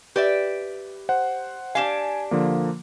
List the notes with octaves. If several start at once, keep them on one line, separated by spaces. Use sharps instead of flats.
G4 B4 D5 E5
C5 F#5
D4 G4 F5 G#5 E7
D3 F3 A#3